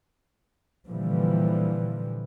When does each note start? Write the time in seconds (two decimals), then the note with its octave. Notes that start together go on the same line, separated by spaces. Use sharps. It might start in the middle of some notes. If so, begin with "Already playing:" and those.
0.88 A#2 D3 E3 F3 G3